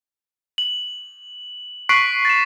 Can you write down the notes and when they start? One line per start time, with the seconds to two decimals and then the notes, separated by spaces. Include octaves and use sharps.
0.58 F#7
1.89 C#6 F#6 B6 C7 D7 F#7
2.25 A6 E7